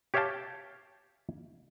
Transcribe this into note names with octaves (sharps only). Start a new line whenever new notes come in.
G4 C#5 E5 F5 G5 A5